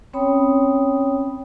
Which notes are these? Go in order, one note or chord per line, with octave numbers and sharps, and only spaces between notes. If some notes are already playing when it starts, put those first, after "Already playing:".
C4 C#4 C#5 G5 B5 D#6